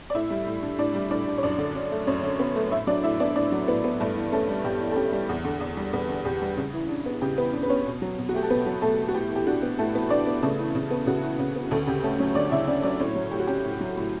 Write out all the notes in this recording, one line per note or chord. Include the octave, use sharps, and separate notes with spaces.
D5
A2 E4 E5
G3
A2
D4
A2 D4 D5
G3
A2 D4 D5
D4
C#5
F#2 D4 D5
D3
C#4
A3
F#2 C#4 C#5
D3
B3 C#4 B4
A3
A2 E4 E5
F#3 D4 D5
A2 E4 E5
B3 D4 D5
A2 D4 D5
F#3
A2 B3 B4
B3
G2 A3 A4
E3
A3 C#4 A4
G3
G2 G4
E3
A4
C#4 G4
G3
E2
D3
E2
G3
E2 B3 B4
D3
E2 G4
G3
C#3
E3
D4
B3
C#3 G4
E3 B3 B4
D4
B4
B3 C#4 C#5
B2
F#3
B2
F#4
A3 G4
A4
B2 B3 B4
F#3
B2 A3 A4
A3
F#4
A2 G4
E3
G4
D4 F#4
B3
A2 A3 A4
E3 B3 B4
D4 D5
B3
C#3 A3 A4
E3
C#3
B3
C#3 F#4
E3
C#3
B3
D2 A3 A4
C#3 G4
A3 C#4 A4
F#3 C#4 C#5
D2 D4 D5
C#3 E4 E5
C#4 D4 D5
F#3 D4 D5
A2 C#4 C#5
F#3
A2 G4
F#4
C#4 G4
A2
F#3
A2